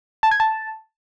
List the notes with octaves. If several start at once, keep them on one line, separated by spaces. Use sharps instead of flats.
A5
G#6
A5